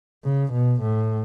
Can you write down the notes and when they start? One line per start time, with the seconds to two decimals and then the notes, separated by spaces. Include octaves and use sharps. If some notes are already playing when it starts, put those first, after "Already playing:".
0.25 C#3
0.53 B2
0.82 A2